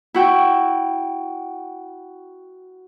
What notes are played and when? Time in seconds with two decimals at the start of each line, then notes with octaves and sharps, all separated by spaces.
0.14 E4 F#4 G5